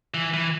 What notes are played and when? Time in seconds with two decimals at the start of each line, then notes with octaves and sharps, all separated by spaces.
0.14 E3
0.34 E3